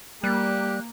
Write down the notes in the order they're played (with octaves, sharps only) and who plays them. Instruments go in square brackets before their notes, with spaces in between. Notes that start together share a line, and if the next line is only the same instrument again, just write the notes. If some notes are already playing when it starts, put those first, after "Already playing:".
[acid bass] G3 [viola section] A#3 [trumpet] G4 [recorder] F#6